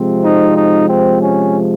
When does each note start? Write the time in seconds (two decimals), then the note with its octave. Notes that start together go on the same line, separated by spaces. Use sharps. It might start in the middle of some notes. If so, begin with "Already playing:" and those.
Already playing: C3 F3 G#3 C4
0.22 D#4
0.56 D#4
0.89 C4
1.22 C#4